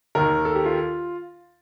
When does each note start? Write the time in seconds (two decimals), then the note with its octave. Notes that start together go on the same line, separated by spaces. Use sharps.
0.15 D#2 D#3 A#4
0.45 A4
0.55 G4
0.65 F4